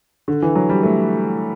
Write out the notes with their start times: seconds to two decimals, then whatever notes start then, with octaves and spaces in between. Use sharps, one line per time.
0.28 D3
0.43 E3
0.55 F#3
0.69 G3
0.83 A3